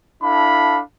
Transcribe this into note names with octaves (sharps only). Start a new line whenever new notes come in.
D4 E4 A4 F5 B5